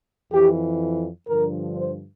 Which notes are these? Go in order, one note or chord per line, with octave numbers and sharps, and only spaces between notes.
F2 E3 G4
G2 D3 F3 A#4
C5